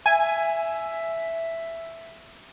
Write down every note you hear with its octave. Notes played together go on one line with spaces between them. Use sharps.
E5 G#5